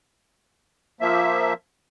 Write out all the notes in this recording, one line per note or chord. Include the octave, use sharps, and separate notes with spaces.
F3 A#3 E5